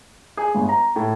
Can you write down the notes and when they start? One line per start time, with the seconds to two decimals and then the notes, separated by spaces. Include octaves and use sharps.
0.37 G#4
0.55 G1
0.69 A#5
0.96 A2